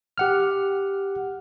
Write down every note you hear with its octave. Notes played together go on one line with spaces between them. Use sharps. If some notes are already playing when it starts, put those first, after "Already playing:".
G4 F#5 F6